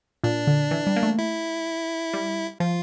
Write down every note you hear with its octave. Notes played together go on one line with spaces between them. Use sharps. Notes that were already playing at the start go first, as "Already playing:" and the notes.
A#2 D4
D3
E3
G3
A#3
A3
E4
G3
F3 F4